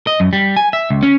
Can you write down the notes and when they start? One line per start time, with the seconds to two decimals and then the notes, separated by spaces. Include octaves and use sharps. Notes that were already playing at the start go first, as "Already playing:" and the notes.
0.07 D#5
0.20 F#2
0.33 G3
0.56 G#5
0.73 E5
0.90 C#2
1.03 C#4